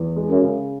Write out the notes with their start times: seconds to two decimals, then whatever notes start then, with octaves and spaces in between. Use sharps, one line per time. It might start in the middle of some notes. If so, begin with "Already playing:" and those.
Already playing: E2
0.16 G#3
0.28 F#2
0.42 C#3